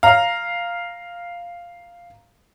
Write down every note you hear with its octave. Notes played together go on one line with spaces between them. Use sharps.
F5 A#5